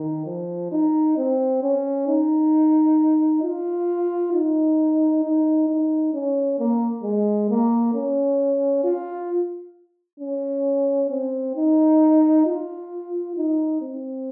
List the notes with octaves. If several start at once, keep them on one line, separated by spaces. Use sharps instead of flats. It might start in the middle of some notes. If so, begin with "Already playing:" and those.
Already playing: D#3
F3
D#4
C4
C#4
D#4
F4
D#4
D#4
D#4
C#4
A#3
G#3
A#3
C#4
F4
C#4
C4
D#4
F4
D#4
C4